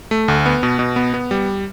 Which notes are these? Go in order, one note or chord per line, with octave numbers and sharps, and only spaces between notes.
A3
D2
B3
B2
B2
B3
B3
G3